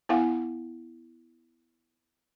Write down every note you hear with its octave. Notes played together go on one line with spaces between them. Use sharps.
B3 E4 F5 F#5 G#5